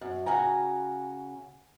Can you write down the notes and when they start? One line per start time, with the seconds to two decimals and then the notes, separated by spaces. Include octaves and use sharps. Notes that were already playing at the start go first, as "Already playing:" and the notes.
0.01 F#2
0.26 C#3 F#4 G#5 A#5